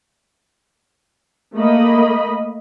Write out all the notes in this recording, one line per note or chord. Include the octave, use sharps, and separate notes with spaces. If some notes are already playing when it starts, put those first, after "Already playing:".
A3 A#3 D#5 B5